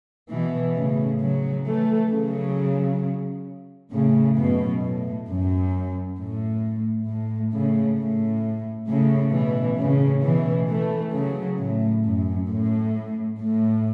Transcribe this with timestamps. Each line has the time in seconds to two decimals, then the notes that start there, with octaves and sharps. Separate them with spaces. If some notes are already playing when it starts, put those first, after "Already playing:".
0.30 B2 E3
0.76 A2 C#3
1.21 C#3 F#3
1.66 E3 A3
2.12 C#3 F#3
3.92 A2 C#3
4.37 F#2 B2
4.82 A2
5.28 F#2
6.17 A2
7.08 A2
7.53 A2 C#3
7.99 A2
8.89 A2 C#3
9.34 B2 E3
9.79 A2 C#3
10.24 B2 E3
10.69 E3 A3
11.15 C#3 F#3
11.59 A2
12.04 F#2
12.50 A2
13.41 A2